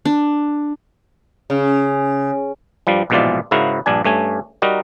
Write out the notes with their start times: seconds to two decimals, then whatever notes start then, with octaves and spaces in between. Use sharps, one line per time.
0.05 D4
1.50 C#3
2.87 G2 F3 G3
3.10 A#1 G#2 B2 E3 F4 D5
3.51 G#2 C#3 E4 F#4 A#4 F5
3.86 A#1 G2 D4 G#5
4.04 G2 A3 C#4 G#5
4.62 G3 D#4 F#4 A#4